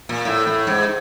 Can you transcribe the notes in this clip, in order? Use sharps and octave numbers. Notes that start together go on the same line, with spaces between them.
A#2
A2
A2
G#2